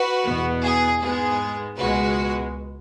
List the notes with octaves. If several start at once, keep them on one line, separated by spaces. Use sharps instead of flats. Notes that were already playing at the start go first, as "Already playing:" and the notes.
Already playing: F#4 B4
E2 B2 B3
G#4
G#2 G#3 B3 G#4
C#2 B2 G#3 F#4 B4